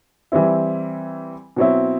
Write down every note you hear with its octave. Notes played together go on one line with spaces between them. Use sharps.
E3 G3 C4 E4
B2 F#3 C4 E4